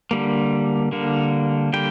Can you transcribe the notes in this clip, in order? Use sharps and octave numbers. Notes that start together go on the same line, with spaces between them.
D3 G3 A#3
D3 G3 A#3
D3 G3 A#3 G5